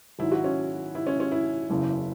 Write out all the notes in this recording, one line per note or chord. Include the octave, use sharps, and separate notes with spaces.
G#1 G#2 F#3 E4
F#4
C#4
E4
C#4
C#4
E4
F#1 E2 C#3 E3